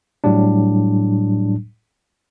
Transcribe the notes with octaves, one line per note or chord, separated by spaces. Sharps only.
A2 F#3 G3 D4